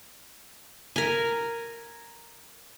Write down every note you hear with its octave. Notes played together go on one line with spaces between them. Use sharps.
A#4 G#5